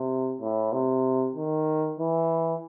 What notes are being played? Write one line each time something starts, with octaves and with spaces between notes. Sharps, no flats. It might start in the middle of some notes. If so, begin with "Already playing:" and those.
Already playing: C3
A2
C3
D#3
E3